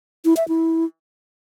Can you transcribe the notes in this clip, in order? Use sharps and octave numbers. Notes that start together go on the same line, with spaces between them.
E4
E5
E4